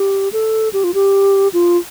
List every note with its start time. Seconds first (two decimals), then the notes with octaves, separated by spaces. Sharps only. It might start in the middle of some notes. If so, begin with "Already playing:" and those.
Already playing: G4
0.33 A4
0.73 G4
0.84 F4
0.94 G4
1.53 F4